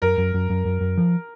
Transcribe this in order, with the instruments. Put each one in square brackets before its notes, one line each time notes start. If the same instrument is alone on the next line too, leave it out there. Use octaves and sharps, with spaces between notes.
[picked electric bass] F#2 [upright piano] A#4
[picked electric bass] F#2
F#2
F#2
F#2
F#2
F3